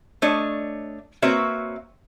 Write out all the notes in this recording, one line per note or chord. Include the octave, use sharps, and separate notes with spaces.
A3 D4 C#5 D#5
A#3 C4 F#4 B4 C#5 E5